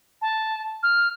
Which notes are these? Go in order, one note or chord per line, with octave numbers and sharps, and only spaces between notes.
A5
F6